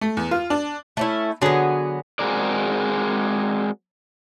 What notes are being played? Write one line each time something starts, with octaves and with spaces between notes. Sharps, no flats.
A3
E2
F4
D4
A3 C#4 E4
D3 F#3 B3 G#4
G#3 C4 F#4 G#4 A#4 D5